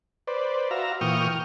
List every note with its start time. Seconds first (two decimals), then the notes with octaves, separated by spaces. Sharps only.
0.27 B4 C5 D5
0.71 F#4 E5 F5 A#5
1.01 A#2 E3 G5 C#6 D#6 F6